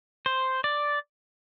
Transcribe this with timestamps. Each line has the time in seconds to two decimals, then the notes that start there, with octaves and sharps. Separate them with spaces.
0.26 C5
0.64 D5